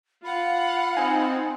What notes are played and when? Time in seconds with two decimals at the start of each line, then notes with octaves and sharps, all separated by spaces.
0.24 F4 F5 F#5 B5
0.97 C4 D#4 G#5